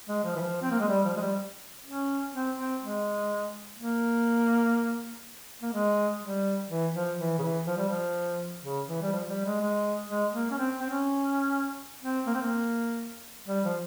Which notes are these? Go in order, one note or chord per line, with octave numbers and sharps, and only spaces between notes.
G#3
F3
E3
F3
C4
A#3
G#3
G3
F3
G#3
G3
C#4
C4
C4
G#3
A#3
A#3
G#3
G3
E3
F3
E3
C#3
E3
F3
G3
F3
C#3
E3
G3
F3
G3
G#3
G#3
G#3
A#3
C#4
C4
C4
C#4
C4
A#3
C4
A#3
G3
F3